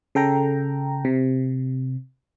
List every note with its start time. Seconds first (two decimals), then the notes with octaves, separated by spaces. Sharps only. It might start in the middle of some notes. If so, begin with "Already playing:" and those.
0.15 C#3 A4 G5 A#5
1.05 C3